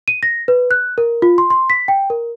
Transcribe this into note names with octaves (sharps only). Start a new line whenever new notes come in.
D#7
A#6
B4
F#6
A#4
F4
C6
C6
B6
G5
A#4